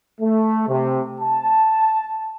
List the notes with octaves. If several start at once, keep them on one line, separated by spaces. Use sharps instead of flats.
A3
C3
A5